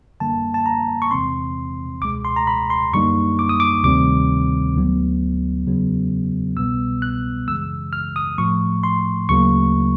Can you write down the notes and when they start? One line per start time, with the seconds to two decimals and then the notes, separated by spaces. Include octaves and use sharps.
0.20 F#2 D3 G3 A#3 A5
0.54 A5
0.66 A#5
1.02 C#6
1.11 E2 C3 E3 G#3 C4 C6
2.02 C#2 B2 G#3 D6
2.25 C6
2.36 A#5
2.47 B5
2.70 C6
2.93 F#2 D3 G3 A#3 D#4 C#6
3.39 D6
3.49 D#6
3.60 D6
3.83 D2 C3 D#3 G3 C4 D6
4.75 D2 D3 F#3 B3
5.65 E2 C#3 F#3 B3
6.56 C2 B2 G3 B3 E6
7.02 F#6
7.48 F#2 C#3 E3 G#3 E6
7.93 F6
8.16 D#6
8.38 A2 F3 A3 C#6
8.84 C6
9.29 D2 C#3 F#3 A#3 C#6